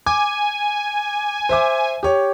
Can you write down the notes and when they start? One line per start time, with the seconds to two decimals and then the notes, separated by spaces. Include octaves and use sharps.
0.06 G#5 D6
1.49 C5 E5 D6
2.03 G4 C#5